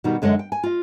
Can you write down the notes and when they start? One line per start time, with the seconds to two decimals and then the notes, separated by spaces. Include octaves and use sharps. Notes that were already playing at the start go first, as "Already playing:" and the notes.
0.04 B2 D#3 G3 D#4 F#4
0.22 F#2 D3 G#3 A4 C#5 D#5
0.39 G5
0.52 G#5
0.63 F4 D#5